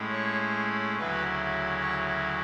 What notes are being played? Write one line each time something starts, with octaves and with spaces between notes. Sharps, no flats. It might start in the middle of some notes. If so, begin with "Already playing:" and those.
Already playing: A2 G#3 C#4 E4
C#5
D2 C#3 F#3 C#4 E4 B4
C#5